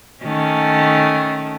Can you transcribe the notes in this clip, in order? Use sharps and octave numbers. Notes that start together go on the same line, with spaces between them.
D#3 A3 C#4